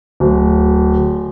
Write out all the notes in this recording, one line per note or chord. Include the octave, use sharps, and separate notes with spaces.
D1